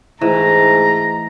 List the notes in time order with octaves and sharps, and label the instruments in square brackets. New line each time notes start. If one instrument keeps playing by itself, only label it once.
[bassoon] G#2 [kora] E3 [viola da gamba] A3 [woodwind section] A#5